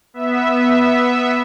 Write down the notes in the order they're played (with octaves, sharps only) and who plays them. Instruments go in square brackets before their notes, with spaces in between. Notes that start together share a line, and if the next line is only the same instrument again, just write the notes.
[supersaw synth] B3 E5